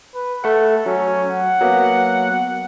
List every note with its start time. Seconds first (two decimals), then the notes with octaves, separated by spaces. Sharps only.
0.15 B4
0.44 A3 A4 F#5
0.86 F#3 C#4
1.31 F#5
1.60 F#3 A#3 B3